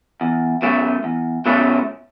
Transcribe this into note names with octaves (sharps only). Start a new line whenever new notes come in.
E2
B2 F#3 A3 C#4
E2
B2 F#3 A3 C#4